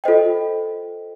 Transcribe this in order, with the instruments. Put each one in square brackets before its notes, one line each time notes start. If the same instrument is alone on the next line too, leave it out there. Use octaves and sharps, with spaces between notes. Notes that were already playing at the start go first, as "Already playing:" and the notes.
[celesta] F4 A4 C5 D#5 G5